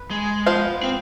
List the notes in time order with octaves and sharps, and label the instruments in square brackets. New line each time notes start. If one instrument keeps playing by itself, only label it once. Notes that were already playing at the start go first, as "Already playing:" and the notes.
Already playing: [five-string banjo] B4
[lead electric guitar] G#3
[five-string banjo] F3 B3 F4 C5
[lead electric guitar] C4